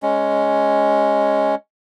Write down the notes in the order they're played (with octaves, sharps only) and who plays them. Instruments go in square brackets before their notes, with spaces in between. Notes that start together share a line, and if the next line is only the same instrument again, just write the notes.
[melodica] G#3 C#4